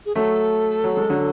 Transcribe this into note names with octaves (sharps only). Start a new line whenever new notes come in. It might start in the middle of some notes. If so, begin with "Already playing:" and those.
G#4
F#3 A3 A4
F#3
G#3
D3 F#3